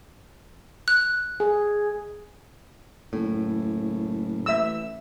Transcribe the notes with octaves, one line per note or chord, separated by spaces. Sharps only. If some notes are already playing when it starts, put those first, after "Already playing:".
F#6
G#4
F#1 A2
A1 E5 E6